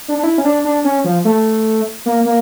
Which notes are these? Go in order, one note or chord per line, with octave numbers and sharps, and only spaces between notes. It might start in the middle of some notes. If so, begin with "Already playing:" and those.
D4
D4
E4
C#4
D4
D4
C#4
F3
A3
A#3
A#3